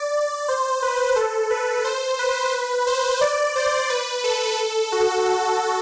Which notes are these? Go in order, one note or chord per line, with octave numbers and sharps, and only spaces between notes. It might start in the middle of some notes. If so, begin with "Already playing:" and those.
Already playing: D5
C5
B4
A4
B4
C5
B4
C5
D5
C5
B4
A4
F#4